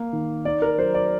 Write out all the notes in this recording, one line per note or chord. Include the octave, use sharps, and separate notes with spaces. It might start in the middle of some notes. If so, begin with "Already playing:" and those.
Already playing: A#3
D#3
D#4 D5
A#4
F#3 C5
D5